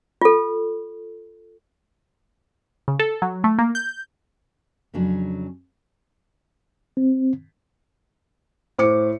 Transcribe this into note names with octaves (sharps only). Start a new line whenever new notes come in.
F4 A4
C#3
A4
F#3
A3
A#3
G6
F2 C#3 F#3 C#4 D4
C4
A2 C5 D6 C#7